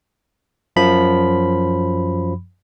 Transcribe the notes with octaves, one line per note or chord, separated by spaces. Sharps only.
F#2 F3 B5